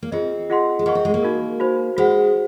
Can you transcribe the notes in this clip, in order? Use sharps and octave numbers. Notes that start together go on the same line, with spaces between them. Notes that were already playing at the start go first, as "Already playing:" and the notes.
A#3
C4 F4 G#4 D#5
F4 G#4 D#5 F#5 C6
G#3
A#3 G#4 D#5 F#5 C#6
C4
G#3
A#3
D#4 F#4 A#4
D#4 F#4 C5
G#3 F#4 C5 F#5